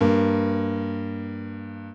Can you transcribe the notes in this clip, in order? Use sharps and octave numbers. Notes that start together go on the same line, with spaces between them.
G2 A#3